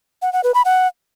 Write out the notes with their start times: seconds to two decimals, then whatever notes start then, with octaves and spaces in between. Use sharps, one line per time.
0.22 F#5
0.33 F#5
0.44 B4
0.54 B5
0.65 F#5